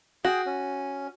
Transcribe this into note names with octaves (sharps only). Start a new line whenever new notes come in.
F#4 G#4 G5
C#4